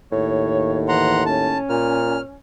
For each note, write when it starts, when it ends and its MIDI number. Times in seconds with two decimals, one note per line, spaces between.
0.12 1.56 39
0.12 1.60 45
0.12 0.80 73
0.88 1.20 52
0.88 1.23 78
0.88 1.23 82
0.88 1.23 84
1.26 2.35 61
1.26 1.58 81
1.69 2.19 46
1.69 2.21 89